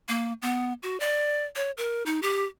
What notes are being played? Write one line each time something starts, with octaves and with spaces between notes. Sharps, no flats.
A#3
B3
F#4
D5
C#5
A#4
D#4
G4